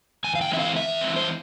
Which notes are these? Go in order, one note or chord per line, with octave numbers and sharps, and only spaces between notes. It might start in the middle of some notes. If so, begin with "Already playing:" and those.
E2 G#5
F5
G5
E3 G#3 C4 E5
F5
E2 E5
E3 G#3 C4
C5